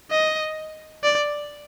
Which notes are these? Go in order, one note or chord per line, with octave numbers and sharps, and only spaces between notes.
D#5
D5